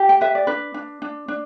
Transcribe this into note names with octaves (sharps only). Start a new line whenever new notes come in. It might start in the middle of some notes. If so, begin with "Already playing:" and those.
Already playing: G4
G5
B4 E5
D5
D4 B4
D4
D4
D4